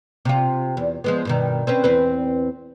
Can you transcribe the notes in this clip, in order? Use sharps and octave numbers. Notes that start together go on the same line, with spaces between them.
C3 F4
E2
F3 G#3 B3
G2 B2 D#3
C4 C#4 B4
E2 C4 B4